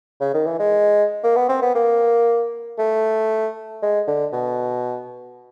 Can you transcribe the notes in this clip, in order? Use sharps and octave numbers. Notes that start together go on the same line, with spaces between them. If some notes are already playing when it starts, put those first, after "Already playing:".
C#3
D#3
E3
G#3
A#3
B3
C4
B3
A#3
A3
G#3
D3
B2